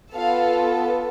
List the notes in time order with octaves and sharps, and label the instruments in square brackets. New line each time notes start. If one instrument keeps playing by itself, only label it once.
[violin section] B3 F4 A4 F5